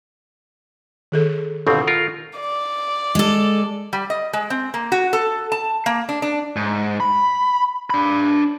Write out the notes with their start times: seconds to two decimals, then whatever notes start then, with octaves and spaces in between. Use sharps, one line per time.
1.12 D#3 G#4 A4
1.67 G1 B2 C4 A4 F5
1.87 F4 A#4
2.39 D5
3.15 G#3 A4
3.93 G3
4.10 D#5
4.33 G#3
4.50 C4
4.74 A#3
4.92 F#4
5.13 A4
5.52 A5
5.86 A#3
6.09 D4
6.22 D4
6.56 G#2
7.00 B5
7.90 D4 B5